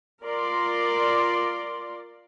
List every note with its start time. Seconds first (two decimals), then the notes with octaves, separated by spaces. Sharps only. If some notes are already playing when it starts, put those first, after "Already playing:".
0.23 F4 A#4 D5 C6